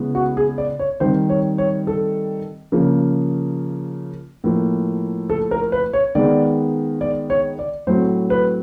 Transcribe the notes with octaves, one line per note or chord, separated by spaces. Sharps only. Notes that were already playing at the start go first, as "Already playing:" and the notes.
Already playing: C#3 E3 G#3 B3
F#4
G#4
D5
C#5
D#3 G3 C4 C5
C#5
C#5
A4
C#3 F3 A#3
A2 F3 A#3
A4
A#4
B4
C#5
D#3 G#3 B3 D5
D5
C#5
D5
A2 F#3 A3 C4 C5
B4